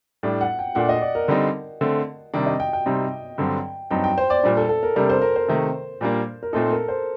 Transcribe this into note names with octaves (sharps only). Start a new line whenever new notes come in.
A2 G3 D4
F#5
G5
A#2 A3 D4 F#5
D#5
D5
A#4
D3 G3 C4 D#4
D3 A3 C4
C3 D#3 G3 D4
D#5
G5
G5
C3 G3 C4 D#4
G2 D3 F#3 C4
G2 F#3 C4 D#4 G5
G5
C5
D5
A#2 G3 D4
A4
A4
A#4
C3 G3 D4 A#4
C5
A#4
C5
C3 D#3 A3
A#2 G3 A#3 D4
A#4
A#2 A3 C4 D#4 A4
A#4
C5